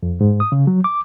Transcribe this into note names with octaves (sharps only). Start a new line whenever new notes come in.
F2
G#2
D#6
C#3
F#3
D6